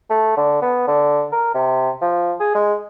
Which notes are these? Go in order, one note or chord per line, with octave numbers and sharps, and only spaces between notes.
A3
D3
B3
D3
A#4
C3
F3
G#4
G#3